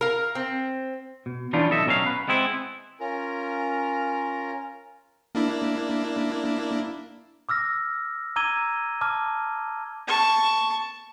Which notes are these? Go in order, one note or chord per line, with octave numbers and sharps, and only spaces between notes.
A#4 F5
C4
B2
E3 G3 B3 C#4 D4 F4
B1 A4 D#5 E5
B2 F#3 C#4 D#5 F5
B4
G#3 B3 C4 E4
C#4 F4 A#4 A#5
A#3 D4 E4
D6 E6 F6 A#6
A#5 D6 E6 G#6 D#7 G7
A5 D6 F6
A5 C#6